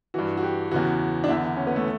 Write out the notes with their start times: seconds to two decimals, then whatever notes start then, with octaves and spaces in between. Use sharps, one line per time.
0.14 G2 E3 F#4
0.37 F#4
0.43 G4
0.71 E2 C#3 E3 F#4
1.24 D4
1.28 E2 D3 E4
1.57 C#4
1.67 B3
1.76 A3